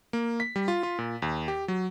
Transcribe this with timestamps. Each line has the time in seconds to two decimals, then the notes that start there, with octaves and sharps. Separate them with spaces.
0.13 A#3
0.40 B6
0.56 G3
0.68 F4
0.83 F4
0.99 A#2
1.22 D#2
1.48 G4
1.68 F#3